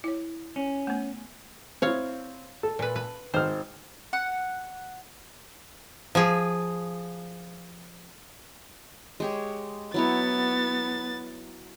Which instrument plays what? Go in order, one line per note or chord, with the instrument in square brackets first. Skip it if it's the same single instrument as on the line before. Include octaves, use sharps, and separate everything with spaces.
[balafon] E4 C#5
[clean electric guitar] C#4
[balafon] A3 B3
[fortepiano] C4 E4 [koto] C#5 F5
[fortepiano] A4
[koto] A#2 B4
B4
[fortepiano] G#1 F6 [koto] C5
[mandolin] F#5
[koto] F3 G#4
[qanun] G#3 G4 C#5
[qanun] F#3 E4 C#5 [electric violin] B3 A6